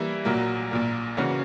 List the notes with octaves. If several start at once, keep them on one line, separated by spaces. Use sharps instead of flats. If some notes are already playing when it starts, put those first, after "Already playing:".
Already playing: E3 G3 A#3 E4
A#1 A#2 F#3 A#3
A#1 A#2 A#3
C#3 E3 A#3 C#4 F#4